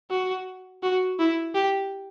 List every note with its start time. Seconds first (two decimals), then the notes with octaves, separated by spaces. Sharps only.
0.10 F#4
0.83 F#4
1.19 E4
1.55 G4